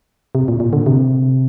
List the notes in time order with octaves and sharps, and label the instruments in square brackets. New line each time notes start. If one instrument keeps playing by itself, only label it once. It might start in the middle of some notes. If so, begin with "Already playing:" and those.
[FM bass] C3
A#2
A#2
D3
C3